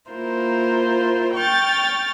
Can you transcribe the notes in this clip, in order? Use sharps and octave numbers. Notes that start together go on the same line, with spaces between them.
A#3 E4 F4 A#4 C5
G5 C#6 F6 A6